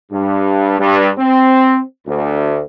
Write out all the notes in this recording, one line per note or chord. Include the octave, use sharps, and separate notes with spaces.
G2
G2
C4
D2